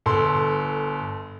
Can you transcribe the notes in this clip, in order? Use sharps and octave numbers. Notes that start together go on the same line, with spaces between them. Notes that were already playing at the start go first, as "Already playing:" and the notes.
G1 A4 C6